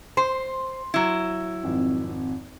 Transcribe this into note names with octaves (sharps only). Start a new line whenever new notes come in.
C5 C6
F#3 E4
G#1 F2